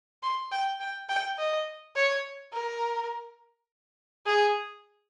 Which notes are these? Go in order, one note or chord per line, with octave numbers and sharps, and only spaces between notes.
C6
G5
G5
G5
D#5
C#5
A#4
G#4